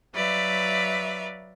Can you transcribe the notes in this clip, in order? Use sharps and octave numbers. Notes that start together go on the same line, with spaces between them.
F#3 B4 D5 E5 F5